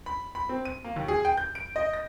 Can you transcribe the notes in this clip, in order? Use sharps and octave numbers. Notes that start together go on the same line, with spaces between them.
B5
B5
C4
D#7
A#3
D#2
G#4
G5
G6
D7
D#5
A#6